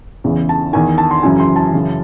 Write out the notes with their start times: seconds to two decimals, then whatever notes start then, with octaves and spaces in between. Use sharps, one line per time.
0.24 E2 C#3 E3
0.49 A5
0.73 E2 D#3 G#5
0.98 A5
1.11 C6
1.23 F#2 C#3 E3 G#5
1.40 C6
1.56 A5
1.74 F#2 C#3 E3